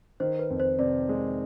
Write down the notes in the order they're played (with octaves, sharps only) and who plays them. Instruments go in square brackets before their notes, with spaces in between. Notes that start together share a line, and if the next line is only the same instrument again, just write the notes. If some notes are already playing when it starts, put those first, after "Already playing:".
[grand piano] D#3 [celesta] C5
[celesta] B4
[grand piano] F2
[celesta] C5
[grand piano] C3 [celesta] D5
[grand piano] G#3